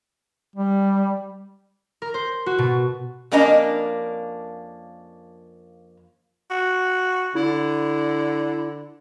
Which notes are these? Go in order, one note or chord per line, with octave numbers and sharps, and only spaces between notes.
G3
A#4
C5
F#4
B2
F2 A#3 C#4 D4 D#5 A#5
F#4
D3 E4